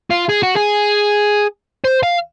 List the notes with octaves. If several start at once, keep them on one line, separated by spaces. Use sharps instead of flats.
F4
G#4
F#4
G#4
C5
F5